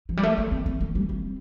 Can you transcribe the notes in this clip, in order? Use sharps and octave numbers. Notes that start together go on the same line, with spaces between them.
F3
G3
A3
A#3
C4
C4
A#3
G3
C4